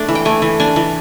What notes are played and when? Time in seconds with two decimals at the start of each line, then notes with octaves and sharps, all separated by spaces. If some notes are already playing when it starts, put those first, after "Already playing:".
Already playing: A3 D4
0.08 E3
0.15 G5
0.25 A3 G#5
0.42 E3
0.60 D4 G#5
0.76 E3